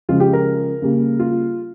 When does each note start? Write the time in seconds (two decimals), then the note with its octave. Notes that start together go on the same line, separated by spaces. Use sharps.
0.09 C#3 F3 G#3 F4
0.20 G4
0.33 A#4
0.82 C#3 G3 A#3
1.19 F4